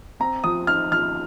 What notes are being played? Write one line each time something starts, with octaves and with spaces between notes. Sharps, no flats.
C4 A#5
F3 D#6
D#4 F6
F3 F6